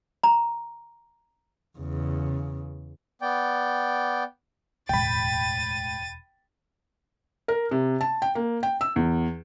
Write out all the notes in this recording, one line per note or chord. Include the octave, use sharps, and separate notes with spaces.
A#5
E2 C#3
B3 D5 G5
E1 D2 A2 G#3 G5 B5 A6 D#7
A#4
C3
A5
G5
A#3
G5
E6
E2